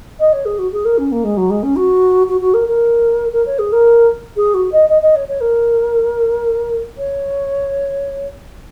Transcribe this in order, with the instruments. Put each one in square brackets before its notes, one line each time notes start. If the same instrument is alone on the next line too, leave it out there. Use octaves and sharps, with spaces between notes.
[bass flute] D#5
C#5
G#4
F#4
G#4
A#4
C#4
A#3
G#3
F#3
G#3
C#4
F#4
F#4
F#4
A#4
A#4
A#4
C#5
G#4
A#4
G#4
F#4
D#5
D#5
D#5
C#5
C#5
A#4
C#5